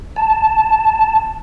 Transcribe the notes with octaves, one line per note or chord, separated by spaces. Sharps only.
A5